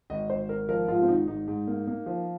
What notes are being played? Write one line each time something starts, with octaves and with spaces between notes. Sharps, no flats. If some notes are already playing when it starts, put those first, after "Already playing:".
G#1 D#5
G#1 C5
G#1 A#4
F3 A#4
G#2 F4
C4
G#1 D#4
G#2 D#4
G#2
A#3
A#3
F3